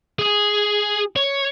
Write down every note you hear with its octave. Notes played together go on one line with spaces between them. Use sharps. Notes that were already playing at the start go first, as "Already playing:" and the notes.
G#4
C#5